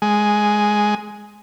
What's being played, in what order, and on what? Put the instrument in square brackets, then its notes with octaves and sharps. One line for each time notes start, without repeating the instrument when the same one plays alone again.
[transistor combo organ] G#3